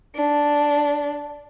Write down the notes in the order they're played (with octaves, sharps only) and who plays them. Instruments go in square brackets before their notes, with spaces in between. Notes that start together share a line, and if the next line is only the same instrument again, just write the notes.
[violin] D4